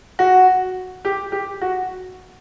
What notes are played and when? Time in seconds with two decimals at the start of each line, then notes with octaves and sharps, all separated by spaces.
0.19 F#4
1.05 G4
1.32 G4
1.61 F#4